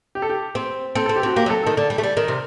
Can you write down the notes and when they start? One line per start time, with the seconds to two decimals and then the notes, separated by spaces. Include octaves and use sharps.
0.15 G4
0.22 A4
0.29 G4
0.55 C4
0.95 C4 A4
1.06 C4 A4
1.16 G4
1.23 C4 F#4
1.36 A#3 G4
1.46 F#3
1.50 A4
1.63 D#3 A4
1.77 D3
1.90 G3
1.98 A3
2.03 G3
2.17 D#3 A#4
2.28 C3